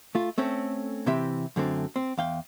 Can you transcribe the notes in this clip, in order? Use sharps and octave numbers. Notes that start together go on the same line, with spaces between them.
A3 F4
A3 C4 C#4 A4
C3 E3 C4 G4 E5
F#2 D3 A3 C4
C4
E2 F5 G5